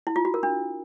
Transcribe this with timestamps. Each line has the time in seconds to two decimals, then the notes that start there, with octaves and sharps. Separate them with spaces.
0.07 E4
0.16 F4
0.25 F#4
0.34 A#4
0.43 D4